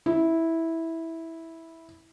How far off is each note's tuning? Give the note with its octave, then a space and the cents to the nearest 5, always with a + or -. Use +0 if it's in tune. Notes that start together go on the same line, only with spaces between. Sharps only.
E4 -10